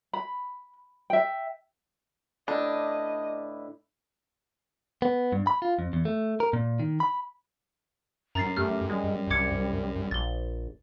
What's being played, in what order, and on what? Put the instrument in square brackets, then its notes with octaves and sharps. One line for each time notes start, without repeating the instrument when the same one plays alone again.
[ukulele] B5
E5 G5
[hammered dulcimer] A2 D3 B4 [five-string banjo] D4 [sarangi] D#5
[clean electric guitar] B3
G2
B5
F4
F2
E2
A3
A#4
A#2
D#3
B5
[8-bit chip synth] F#2 [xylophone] A#5 A6 C7
[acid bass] A3 [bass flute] G4 [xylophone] F6
[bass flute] G3 [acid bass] G#3
[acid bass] C2 [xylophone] D6 G#6 C#7
[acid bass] A#1 [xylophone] A6 G7